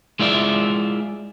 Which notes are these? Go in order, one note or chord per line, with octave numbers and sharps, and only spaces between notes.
G#3 E4 F4 D5 E5